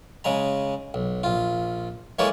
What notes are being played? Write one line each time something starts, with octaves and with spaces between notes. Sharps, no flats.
C#3 G#3 A#5
B1
A#1 F4
E3 G#3 A#3 A4 C#5